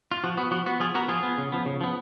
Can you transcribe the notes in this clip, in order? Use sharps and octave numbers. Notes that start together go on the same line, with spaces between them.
F4
F3 F#4
B3 F#4
F3 F#4
B3 F#4
F3 F4 G#4
B3 F#4 A#4
F3 F4 G#4
B3
C#3
F3 B3
C#3
F3 B3